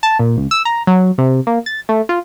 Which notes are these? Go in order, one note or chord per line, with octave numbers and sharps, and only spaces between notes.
A5
A#2
C#2
E6
A#5
F#3
C3
A#3
A6
A3
F4